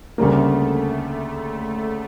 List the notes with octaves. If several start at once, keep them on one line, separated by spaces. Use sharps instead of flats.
D2 C#3 G3 A3 A#3